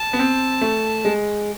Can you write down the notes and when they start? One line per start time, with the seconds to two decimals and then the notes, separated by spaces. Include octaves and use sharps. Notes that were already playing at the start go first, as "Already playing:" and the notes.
Already playing: A5
0.13 B3
0.19 C4
0.61 A3
1.05 G#3